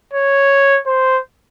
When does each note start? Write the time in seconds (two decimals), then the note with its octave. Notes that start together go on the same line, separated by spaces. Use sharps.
0.14 C#5
0.87 C5